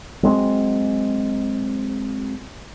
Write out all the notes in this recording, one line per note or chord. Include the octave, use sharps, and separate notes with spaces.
F#3 G#3 C4